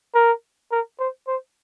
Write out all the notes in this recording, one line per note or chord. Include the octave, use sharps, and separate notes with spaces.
A#4
A#4
C5
C5